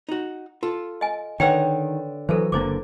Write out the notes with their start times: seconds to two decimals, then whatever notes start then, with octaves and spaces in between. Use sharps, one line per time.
0.09 D#4 F#4
0.63 F4 A4
1.01 D#5 G#5
1.40 D3 D#3 B4 C#5 F#5 G5
2.29 E3 F#3 A4 B4 C5
2.52 F#1 D3 A#3 E4 C5 D6